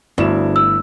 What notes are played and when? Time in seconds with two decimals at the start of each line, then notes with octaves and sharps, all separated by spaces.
0.18 G1 D2 E4 E7
0.56 E6